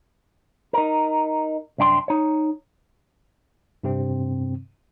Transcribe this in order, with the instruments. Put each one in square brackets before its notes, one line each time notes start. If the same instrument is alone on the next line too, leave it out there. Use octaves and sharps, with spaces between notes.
[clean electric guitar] D#4 A#4
C2 F#2 D4 G5 C6
D#4 C#5
[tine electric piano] G2 C3 C4